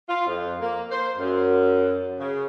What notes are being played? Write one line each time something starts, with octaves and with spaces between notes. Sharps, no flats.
F4
F2
A#3
C5
F#2
C#3